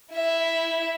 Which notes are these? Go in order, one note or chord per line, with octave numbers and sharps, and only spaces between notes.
E4 E5